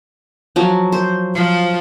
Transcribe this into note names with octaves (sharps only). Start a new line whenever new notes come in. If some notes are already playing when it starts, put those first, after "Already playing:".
F3 F#3
C5
F3